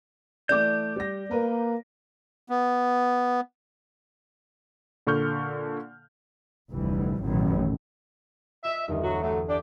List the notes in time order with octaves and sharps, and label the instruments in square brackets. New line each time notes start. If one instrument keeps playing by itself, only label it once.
[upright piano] E3 A3 D6 [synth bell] D5 [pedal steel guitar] G6
[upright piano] G3 A#6
[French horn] A#3 [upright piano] A#4 B4
[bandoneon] B3
[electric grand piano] A#2 D3 A4 C#6 F6 G6
[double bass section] F1 D2 E3 G3
A1 F#2 B2 D#3
[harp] F4 D#5 [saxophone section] E5
[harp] G1 E2 [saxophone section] G2 D#3
[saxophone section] D2 F#3 F#4
D3 F#3 A3
D4 G4 D5